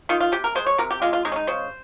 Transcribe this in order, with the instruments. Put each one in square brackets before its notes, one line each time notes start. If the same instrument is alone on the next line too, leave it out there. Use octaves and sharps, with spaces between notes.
[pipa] D#3 F4
F4
C3 G4
A#4
G#3 C5
C#5
C3 A#4
G4
G#3 F4
F4
G#3 D#4
C#4
D#4
C#3 C5